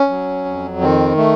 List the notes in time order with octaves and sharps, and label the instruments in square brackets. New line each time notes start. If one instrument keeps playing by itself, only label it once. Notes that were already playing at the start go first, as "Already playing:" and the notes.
Already playing: [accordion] C#4
F#3
F2
D#3 C4
A3